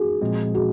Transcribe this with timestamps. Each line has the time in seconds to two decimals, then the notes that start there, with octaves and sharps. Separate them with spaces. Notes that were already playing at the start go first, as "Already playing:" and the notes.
Already playing: F#4 G#4
0.21 A#2 F3 G#3 C4
0.55 F#4 G#4